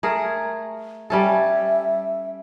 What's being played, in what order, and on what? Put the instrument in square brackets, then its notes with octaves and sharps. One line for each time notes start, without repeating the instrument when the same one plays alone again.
[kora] A3 G#4 A#4
[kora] G3 C#4 A4 [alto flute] E5